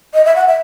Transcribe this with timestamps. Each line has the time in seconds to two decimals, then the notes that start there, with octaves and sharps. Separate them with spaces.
0.14 D#5
0.25 E5
0.36 F#5
0.48 E5